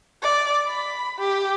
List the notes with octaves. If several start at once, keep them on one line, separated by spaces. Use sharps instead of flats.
D5
B5
G4